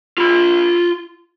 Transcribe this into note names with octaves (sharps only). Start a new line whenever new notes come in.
F4 B5